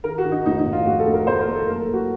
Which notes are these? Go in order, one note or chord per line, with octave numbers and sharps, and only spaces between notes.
D#3 A#4
F#4
D#3
D#4
F1 D#4
D#4
F1
F4
F1 F#4
A4
F1
A#4
F1 C5
A#4
F1
A4
F#1 A#4
A4
F#1
F#4